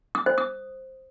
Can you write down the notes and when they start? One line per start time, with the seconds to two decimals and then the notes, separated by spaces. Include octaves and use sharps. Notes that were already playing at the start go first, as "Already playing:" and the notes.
0.15 D#6
0.26 C5
0.38 D#6